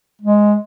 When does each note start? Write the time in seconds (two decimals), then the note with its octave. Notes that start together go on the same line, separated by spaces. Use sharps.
0.22 G#3